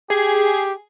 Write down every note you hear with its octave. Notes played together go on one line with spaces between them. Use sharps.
G4 G#4